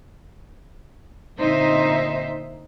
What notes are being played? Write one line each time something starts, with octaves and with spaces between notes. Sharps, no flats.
A#2 D3 C4 D#4 C5 E5